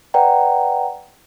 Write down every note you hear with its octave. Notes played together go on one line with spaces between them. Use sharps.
B4 D5 F#5 G5 A#5